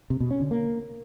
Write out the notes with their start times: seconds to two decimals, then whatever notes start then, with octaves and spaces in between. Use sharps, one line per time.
0.10 C3
0.20 B2
0.31 C#4
0.41 D3
0.51 A#3